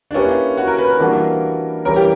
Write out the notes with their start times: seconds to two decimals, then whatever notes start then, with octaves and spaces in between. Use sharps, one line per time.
0.11 D4
0.14 A#3 C#4 E4 G4 B4
0.57 F#4
0.68 A#4
0.79 B4
0.90 A#4
0.99 E3 G3 A#3 D4 F#4
1.85 E3 G3 C#4 A#4
1.96 G4